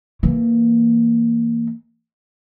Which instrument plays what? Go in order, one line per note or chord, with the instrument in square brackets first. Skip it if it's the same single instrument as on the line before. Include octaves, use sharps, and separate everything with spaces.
[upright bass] E3 A#3